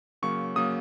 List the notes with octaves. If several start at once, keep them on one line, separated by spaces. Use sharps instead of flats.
C#3 F#3 A#3 C#6
C#3 F#3 A#3 D#6